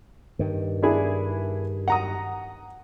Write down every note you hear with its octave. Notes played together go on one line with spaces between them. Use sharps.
G2 D#3
D4 E4 G#4
F#5 A#5 D#6